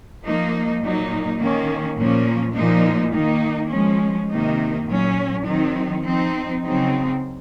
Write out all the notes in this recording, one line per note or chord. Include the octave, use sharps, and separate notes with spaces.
F3 A#3 D#4
A#2 F#3 A#3 D#4
D#3 A#3 C#4
A#2 F3 A#3 C#4
A#2 F3 A#3 D#4
D#3 A#3 D#4
F3 G#3 C#4
C3 D#3 A#3 D#4
A#2 F#3 C#4
D#3 F#3 C4 D#4
F3 C4 D#4
C#3 F#3 C4 D#4